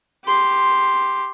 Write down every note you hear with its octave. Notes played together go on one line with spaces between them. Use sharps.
G4 C6